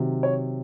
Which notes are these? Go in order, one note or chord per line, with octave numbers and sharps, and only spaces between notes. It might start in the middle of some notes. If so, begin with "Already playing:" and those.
Already playing: C3 D#3 F#3
C#5